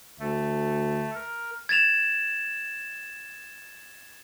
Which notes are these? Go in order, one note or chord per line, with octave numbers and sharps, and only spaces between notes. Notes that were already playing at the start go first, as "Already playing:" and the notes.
D2 A3
A#4
G#6 A6 E7 F7